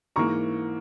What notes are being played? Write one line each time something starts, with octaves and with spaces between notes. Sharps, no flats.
G#2 E3 A#3 A#5 C#6